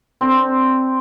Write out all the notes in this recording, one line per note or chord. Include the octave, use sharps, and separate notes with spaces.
D3 C4 C5